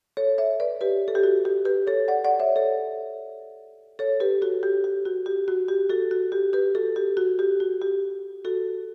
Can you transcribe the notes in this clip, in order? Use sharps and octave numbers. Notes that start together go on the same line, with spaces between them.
A4 C#5
C#5 E5
B4 D5
G4 B4
A4
G4
F#4
G4
G4 B4
A4 C#5
D5 F#5
D5 F#5
C#5 E5
A4 C#5
A4 C#5
G4 B4
F#4 A4
G4
G4
F#4
G4
F#4
G4
F#4 A4
F#4
G4
G4 B4
F#4 A4
G4
F#4
G4
F#4
G4
F#4 A4